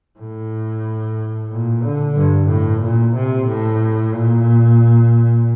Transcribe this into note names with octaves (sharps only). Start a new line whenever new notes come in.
A2
A#2
D3
G2
A2
A#2
C3
A2
A#2